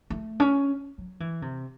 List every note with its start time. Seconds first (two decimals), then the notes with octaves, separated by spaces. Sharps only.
0.10 A3
0.40 C#4
0.98 F#3
1.20 E3
1.42 C3